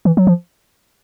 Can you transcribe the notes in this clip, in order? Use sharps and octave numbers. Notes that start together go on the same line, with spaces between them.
E3
F#3
F3